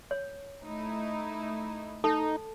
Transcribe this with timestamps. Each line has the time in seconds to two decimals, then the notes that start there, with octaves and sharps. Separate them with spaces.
0.11 C#5
0.64 A3 D#4 E4
2.04 D#4 A4 A5